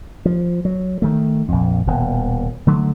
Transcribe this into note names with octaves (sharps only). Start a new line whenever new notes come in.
F3
F#3
D#3 A3
A#1 F2
D#1 B2
D3 F#3 A3